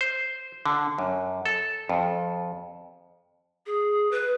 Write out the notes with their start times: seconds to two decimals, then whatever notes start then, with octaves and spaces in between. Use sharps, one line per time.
0.01 C5
0.66 D3
0.98 F#2
1.46 A4
1.89 F2
3.66 G#4
4.11 B4